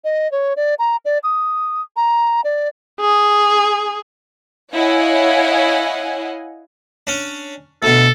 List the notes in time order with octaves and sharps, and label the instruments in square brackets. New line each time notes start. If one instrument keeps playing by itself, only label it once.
[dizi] D#5
C#5
D5
A#5
D5
D#6
A#5
D5
[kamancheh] G#4
[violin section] E4 C#5 D#5 F5 F#5 G#5
[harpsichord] C#4 D4
[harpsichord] D2 B2 [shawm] A4